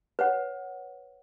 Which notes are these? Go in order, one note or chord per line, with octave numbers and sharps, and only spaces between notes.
B4 C#5 F#5